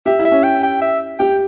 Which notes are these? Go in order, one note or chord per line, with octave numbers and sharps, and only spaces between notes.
G4 E5
E4
E5
C#4
G5
G5
E5
G4 G5